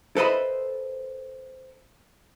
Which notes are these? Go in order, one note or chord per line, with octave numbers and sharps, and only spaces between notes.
A4 B4 C5 D#5 E5 B5